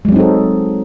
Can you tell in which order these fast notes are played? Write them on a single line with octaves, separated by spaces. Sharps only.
G#3 F#3 C4 D#4 A4